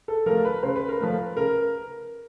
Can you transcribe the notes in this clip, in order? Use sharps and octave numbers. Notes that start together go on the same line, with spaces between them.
A4
F3 A3 A#4
B4
C#3 C5
B4
A#4
F3 A3 B4
C#3 A#4